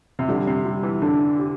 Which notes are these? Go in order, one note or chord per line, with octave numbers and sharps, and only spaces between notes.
C3
D3 G3
C3
G3
E3
D3 D4
G4